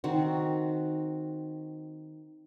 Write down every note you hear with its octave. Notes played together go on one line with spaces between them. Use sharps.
D#3 C4 F#4